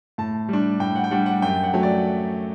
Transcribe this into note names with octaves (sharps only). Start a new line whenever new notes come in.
A2 A5
G3 D4
A2 G5
F#5
G5
G3 D4 F#5
F#5
F#2 G5
F#5
F#3 A3
D5